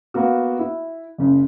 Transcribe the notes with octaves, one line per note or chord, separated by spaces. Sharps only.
A#3 B3 F#4
E4
F#1 C#3